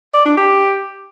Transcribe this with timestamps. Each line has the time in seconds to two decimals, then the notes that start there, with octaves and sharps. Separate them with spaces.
0.14 D5
0.25 D4
0.37 G4